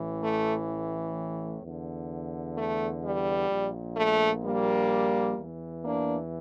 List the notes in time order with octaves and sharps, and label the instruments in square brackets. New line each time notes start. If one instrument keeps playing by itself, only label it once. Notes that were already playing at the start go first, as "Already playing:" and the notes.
Already playing: [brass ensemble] A1 A2 E3
A3
E2 D3
A3
G3
A#1 A#2
A3
G3 A#3
E2 E3
A#3 D4